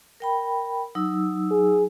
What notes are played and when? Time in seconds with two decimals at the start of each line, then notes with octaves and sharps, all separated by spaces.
0.20 A#4 G5 B5
0.95 F#3 D#4 E6
1.51 G#4